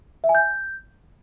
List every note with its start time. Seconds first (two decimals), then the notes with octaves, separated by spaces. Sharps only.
0.24 E5
0.29 G#5
0.35 G6